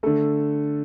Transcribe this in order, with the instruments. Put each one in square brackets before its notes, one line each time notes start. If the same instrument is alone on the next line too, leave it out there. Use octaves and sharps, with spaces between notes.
[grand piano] D3 A3 A4